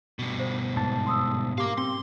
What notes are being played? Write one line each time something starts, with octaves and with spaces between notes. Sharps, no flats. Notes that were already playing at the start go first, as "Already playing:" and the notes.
G2 B2
C5
G#2 A5
C6 D#6 E6
G4 A#4 F5 D6
C4 C6